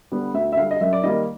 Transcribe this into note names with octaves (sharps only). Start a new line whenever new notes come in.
D3 G3 B3
D2 E5
E5
D3 G3 F5
D#5
F#2 E5
D5
D#3 G3 A#3 D#5